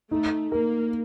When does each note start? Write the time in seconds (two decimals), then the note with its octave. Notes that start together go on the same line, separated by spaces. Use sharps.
0.11 A3 D#4
0.52 A#3 A#4